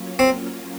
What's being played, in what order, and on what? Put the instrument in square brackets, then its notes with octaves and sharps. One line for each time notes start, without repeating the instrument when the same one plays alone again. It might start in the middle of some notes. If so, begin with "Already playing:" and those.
Already playing: [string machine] F#3 A#3 C#4 F4
[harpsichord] C4